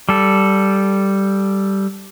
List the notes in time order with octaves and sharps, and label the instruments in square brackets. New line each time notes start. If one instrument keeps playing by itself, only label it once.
[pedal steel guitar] G3 A4